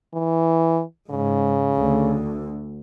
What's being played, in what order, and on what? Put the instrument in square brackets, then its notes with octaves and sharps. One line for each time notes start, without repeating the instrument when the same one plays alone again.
[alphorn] E3
[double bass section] G#2 [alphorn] C#3
[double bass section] D2